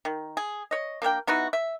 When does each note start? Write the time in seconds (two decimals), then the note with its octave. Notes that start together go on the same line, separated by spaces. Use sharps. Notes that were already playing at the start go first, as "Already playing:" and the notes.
0.05 D#3
0.37 G#4
0.71 C#5 D#5
1.02 A#3 D4 A#4 G5
1.27 B3 D#4 E4 F#4
1.53 E5